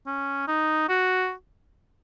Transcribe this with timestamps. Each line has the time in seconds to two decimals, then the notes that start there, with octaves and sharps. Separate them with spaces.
0.06 C#4
0.48 D#4
0.89 F#4